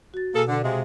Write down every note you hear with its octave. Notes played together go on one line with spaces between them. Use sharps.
F#4 A6
B2 A#3 G#4 A4
D3
C3 G#3 F5